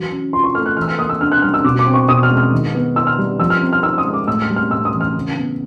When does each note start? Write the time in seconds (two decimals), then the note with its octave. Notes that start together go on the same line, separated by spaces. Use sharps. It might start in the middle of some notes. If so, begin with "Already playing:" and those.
Already playing: E3 F#3
0.11 C#4
0.33 F4 C6
0.44 C#6
0.55 A3 F6
0.66 F#6
0.77 E3 F6
0.82 E6
0.88 F6
0.98 A#3 D#6
1.10 E6
1.21 D4 F6
1.32 F#6
1.42 G3 F6
1.54 E6
1.64 B2 D6
1.79 D6
1.87 C4
1.94 C#6
2.08 B2 D#6
2.23 F6
2.30 G#3
2.37 F6
2.52 D#3
2.74 B3
2.96 E4 E6
3.07 F6
3.18 G3
3.40 F3 E6
3.50 F6
3.61 C4
3.73 F6
3.83 D#4 E6
3.98 D#6
4.05 G#3
4.13 D6
4.28 A2 E6
4.42 F6
4.50 G3
4.56 F6
4.71 A2 E6
4.85 D#6
4.93 E3
5.01 F6
5.15 C#3
5.37 B3